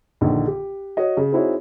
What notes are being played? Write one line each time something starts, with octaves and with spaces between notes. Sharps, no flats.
A#1 D3 D#3
G4
F#4 C#5 D#5
C#3
C4 D#4 E4 F#4 G#4 C#5